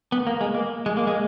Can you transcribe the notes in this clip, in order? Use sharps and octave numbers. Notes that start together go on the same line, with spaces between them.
B3
A#3
G#3
A#3
G#3
A#3
G#3